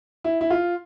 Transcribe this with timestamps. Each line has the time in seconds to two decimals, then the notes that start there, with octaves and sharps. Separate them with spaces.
0.24 E4
0.41 E4
0.50 F4